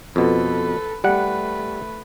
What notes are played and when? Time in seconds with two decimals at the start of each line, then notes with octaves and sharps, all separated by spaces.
0.16 F2 B2 A4 B4
1.04 G3 A3 B4 F#5